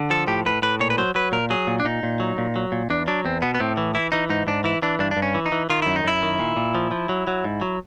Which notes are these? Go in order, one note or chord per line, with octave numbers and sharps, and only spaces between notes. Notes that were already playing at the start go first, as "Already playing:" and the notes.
Already playing: D3
F3 A4
A2 G4
A2 B4
A2 B4
A#2 C#5
B4
F#3 C5
F#3 B4
A#2 A#4
F#3 G#4
A#2
D4
A#2 D#4
A#2
F#3
A#2
F#3
A#2
E2 D4
F#3 D4
E2 C4
B2 B3
B3
A2 C4
E3
E3 E4
E3 D#4
G#2 D#4
G#2 D4
E3 E4
E3 D4
G2 D4
D4
G2
C#4
E3
D#4
E3
D#3 F4
F#2 E4
D#4
F#2 E4
D#3
A#2
A#2
F3
F3
F#3
F#3
G#2
F#3